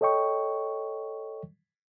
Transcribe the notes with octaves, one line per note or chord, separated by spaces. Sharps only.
A4 C#5 D#5 G5 C#6